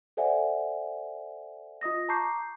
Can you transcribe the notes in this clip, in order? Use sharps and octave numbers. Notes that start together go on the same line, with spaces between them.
A4 C5 D5 E5 F#5 G#5
F4 D#5 D#6 A#6
A5 A#5 C#6 D6 G6 C7